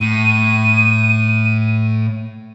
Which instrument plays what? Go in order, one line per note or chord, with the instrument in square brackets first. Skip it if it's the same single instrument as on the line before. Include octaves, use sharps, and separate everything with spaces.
[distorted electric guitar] A2 [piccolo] D#7